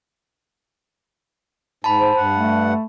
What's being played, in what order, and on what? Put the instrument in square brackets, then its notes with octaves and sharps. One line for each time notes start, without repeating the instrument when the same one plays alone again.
[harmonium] G#2 [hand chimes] A5 B5
[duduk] C5
[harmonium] G2 F#5
[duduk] A3